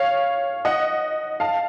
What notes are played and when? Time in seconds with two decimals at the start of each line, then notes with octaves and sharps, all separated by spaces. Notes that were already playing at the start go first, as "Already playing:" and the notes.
Already playing: C#5 F5
0.65 D#5 F#5
1.40 F5 A5